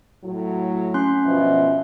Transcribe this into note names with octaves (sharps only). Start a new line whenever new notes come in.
A2 F#3
C#4 C6 F#6
G2 B2 F3 E5